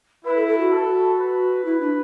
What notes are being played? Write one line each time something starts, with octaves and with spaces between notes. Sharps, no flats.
E4 B4
A4
A4
F#4
A4
B4
E4
D4